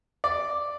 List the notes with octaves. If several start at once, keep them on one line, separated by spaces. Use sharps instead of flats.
D5